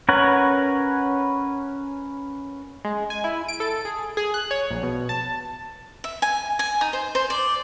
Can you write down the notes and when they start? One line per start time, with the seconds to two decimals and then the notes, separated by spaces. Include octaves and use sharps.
0.09 C#4 A#4 B4 C#5 F#5
2.85 G#3
3.10 G#5
3.24 E4
3.48 D7
3.60 A4
3.85 G#4
4.17 G#4
4.34 F#6
4.51 C#5
4.70 A#1
4.83 B2
5.09 A5
6.04 E5
6.22 G#5
6.59 G#5
6.81 D#4
6.93 C5
7.15 C5
7.30 D5